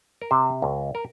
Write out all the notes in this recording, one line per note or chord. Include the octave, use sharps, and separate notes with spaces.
A#4
C3 C5
C#2
A#4